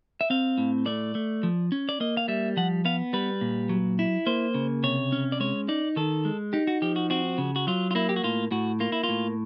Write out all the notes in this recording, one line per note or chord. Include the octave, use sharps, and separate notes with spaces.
E5
C4 F5
A2
A3 D5
A3
F3
C#4
D5
A#3 D#5
F5
G3 E5
F3 F#5
B3 F5
G3 B4
A#2
F#3
E4
A#3 C5
C#3
C3 C#5
C#4
D5
G#3 C#5
D#4 D5
D#3 A4
G#3
D#4 G4
F#4
F3 G4
F#4
C4 F#4
C#3
F#4
F#3 F4
F4
A#3 E4
G4
F#4
A2 F4
A2 F#4
A#3 F4
E4
F4
A2